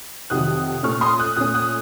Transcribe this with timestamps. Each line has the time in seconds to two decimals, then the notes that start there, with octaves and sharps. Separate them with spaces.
0.30 F2 C3 D#3 F#3 D#6 F#6
0.83 A#2 A3 C#4 C#6 F6
1.01 C6 D#6
1.19 D#6 F#6
1.36 A#2 A3 C#4 D#6 F#6
1.54 D#6 F#6